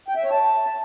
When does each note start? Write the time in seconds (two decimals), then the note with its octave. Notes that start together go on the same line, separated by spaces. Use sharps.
0.08 G5
0.16 E5
0.23 C#5
0.31 A5